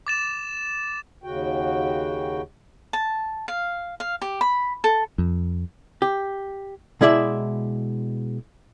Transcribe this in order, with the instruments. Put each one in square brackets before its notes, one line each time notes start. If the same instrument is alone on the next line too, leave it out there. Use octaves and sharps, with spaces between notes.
[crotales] D6 A6 E7
[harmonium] D#2 C#3 F#4 G5
[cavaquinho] A5
F5
F5
G4
B5
A4
[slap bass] F2
[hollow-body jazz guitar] G4
B2 G#3 E4 D5 E5